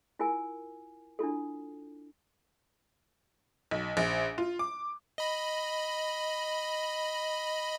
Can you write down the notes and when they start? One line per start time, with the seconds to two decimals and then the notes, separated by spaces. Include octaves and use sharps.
0.19 E4 F4 A#4 G#5
1.19 D4 E4 F4 A4
3.71 B1
3.97 A#1
4.38 F4
4.59 D6
5.18 D#5 B5